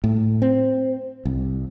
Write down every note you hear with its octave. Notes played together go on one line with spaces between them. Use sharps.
A2
C4
C2